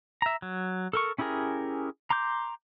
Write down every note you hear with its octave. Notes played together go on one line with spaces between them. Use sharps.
E5 A#5
F#3
A4 A#4 C#6
C#4 E4 G4 G#4 A#4
A#5 C6 D6 G6